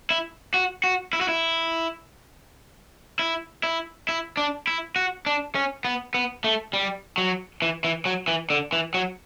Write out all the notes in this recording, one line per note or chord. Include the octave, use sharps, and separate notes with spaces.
E4
F#4
F#4
E4
F#4
E4
E4
E4
E4
D4
E4
F#4
D4
C#4
B3
B3
A3
G3
F#3
E3
E3
F#3
E3
D3
E3
F#3